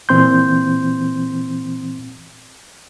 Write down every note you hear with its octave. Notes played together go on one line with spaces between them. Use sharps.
A#2 E3 C4 C6 G6